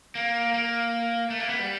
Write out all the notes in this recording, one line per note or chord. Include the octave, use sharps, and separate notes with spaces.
A#3
A#3
A3
A#3
B3
G3